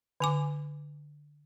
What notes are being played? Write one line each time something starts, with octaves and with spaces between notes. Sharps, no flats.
D3 G#5 D6